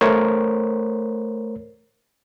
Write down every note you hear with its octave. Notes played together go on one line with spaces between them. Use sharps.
A3 A#4 C5 C#5